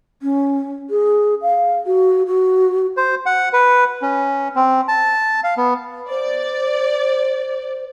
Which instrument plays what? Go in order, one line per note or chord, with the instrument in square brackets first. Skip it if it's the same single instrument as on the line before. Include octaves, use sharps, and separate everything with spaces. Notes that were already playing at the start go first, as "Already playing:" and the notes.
[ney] C#4
G#4
F5
F#4
F#4
[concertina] C5
F#5
B4
C#4
C4
A5
F5
B3
[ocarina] C5 [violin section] D5